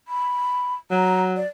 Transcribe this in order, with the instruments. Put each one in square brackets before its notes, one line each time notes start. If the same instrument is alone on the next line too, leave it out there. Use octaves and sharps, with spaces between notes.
[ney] B5
[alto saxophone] F#3 [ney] A#5
[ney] D5